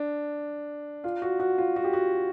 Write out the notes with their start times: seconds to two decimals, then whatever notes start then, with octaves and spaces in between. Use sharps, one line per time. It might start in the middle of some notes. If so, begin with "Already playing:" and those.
Already playing: D4
1.04 F4
1.22 F#4
1.40 F#4
1.58 F4
1.76 F#4
1.84 G4
1.93 F#4